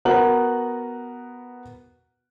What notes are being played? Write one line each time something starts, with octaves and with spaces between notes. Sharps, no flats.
B3 F#4 A#4 F#7